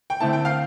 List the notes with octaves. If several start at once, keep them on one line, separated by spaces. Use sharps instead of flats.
G5
D3 A3 C4 E4 A5
G5
F5